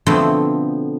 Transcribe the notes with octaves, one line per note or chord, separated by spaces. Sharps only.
B2 D3 F3 A3 B3 C4